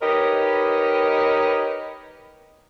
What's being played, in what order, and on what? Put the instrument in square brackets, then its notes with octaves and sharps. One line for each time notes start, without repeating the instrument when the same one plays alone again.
[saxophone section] D#4 G4 A#4 B4 C#5 D#5